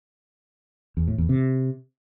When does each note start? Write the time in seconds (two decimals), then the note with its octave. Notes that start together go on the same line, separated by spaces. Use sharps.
0.97 E2
1.08 A2
1.18 E2
1.29 C3